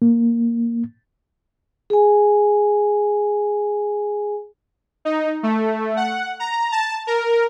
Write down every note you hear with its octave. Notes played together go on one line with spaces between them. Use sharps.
A#3
G#4 G#5
D#4
A3
F#5
A#5
A5
A#4